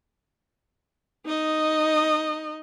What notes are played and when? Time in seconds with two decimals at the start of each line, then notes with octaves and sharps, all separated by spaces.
1.25 D#4 D#5